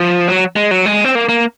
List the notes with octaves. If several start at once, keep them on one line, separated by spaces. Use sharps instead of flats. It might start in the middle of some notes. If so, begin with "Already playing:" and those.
Already playing: F3
F#3
G#3
F#3
G#3
C4
A#3
A#3